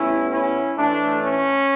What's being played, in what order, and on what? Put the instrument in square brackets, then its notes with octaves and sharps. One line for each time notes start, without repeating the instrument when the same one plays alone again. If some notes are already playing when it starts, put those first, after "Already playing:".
Already playing: [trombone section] A2 G3 B3 C#4 E4
C#4 E4
A2 E3 A3 D4
C#4